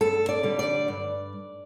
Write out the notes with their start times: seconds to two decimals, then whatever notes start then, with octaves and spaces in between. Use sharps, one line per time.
0.01 G2 A4
0.29 D5
0.43 D3 G3
0.59 D5
0.88 G2